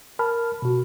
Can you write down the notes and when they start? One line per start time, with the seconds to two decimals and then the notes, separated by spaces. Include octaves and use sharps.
0.19 A#4 A5 B5 F6
0.62 B2 F#4